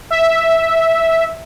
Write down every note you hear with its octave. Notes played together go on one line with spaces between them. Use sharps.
E5